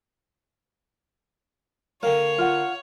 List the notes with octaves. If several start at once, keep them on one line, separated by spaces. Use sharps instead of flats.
D3 A#3 C#5 F5 G5
F4 F#5